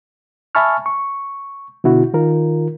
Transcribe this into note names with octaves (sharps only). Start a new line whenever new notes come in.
E5 G#5 A5 B5 C#6 F6
C#6
B2 D3 E4 F#4
D#3 F4 A#4